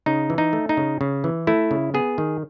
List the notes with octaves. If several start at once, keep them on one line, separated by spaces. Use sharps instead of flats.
C#3 D#4
E3
D#4
A3
D#4
C#3
C#3
E3
A3 E4
C#3
B3 G#4
D#3